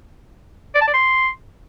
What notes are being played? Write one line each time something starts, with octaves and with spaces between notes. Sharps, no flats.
D5
A5
D5
C6